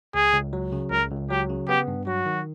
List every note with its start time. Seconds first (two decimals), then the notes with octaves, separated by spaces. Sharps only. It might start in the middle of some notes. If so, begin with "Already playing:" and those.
0.14 C#2 G#4
0.34 C#2
0.53 F#3
0.72 C#3
0.91 C#2 A#4
1.11 C#2
1.30 F#3 G4
1.49 C#3
1.68 B3 G4
1.88 G2
2.07 F#3 F#4
2.26 D#3